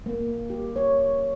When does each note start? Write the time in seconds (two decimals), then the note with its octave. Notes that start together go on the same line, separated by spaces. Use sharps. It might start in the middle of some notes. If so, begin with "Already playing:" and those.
0.06 A#3
0.50 G4
0.76 C#5